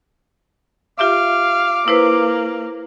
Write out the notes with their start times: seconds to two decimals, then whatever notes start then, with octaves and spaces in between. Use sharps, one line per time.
0.99 F4 G4 E5 F5 D6
1.88 A#3 E4 B4 C5